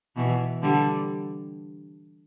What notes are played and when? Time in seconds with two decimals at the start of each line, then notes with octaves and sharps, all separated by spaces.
0.16 B2 E3
0.62 D3 G3